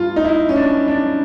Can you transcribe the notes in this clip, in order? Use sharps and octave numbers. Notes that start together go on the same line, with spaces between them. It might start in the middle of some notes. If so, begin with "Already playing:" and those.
Already playing: G2 G3 A#3 F4
D#4
E4
C#4
D4
D4